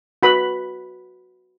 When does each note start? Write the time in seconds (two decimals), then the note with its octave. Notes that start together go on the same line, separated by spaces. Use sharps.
0.23 F#4 B4 B5